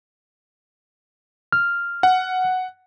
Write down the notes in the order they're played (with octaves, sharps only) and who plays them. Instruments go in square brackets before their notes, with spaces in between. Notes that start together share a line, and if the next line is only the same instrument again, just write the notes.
[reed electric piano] F6
[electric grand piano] F#5